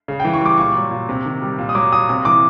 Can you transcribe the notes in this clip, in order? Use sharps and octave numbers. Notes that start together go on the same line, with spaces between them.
C#3
G5
E3
C#6
G3 D6
A#2 C#6
F#3
A#2
C3
D#3
G3
A#2
D#6
F#3 D6
A#2 D#6
C3 D#6
E3 D6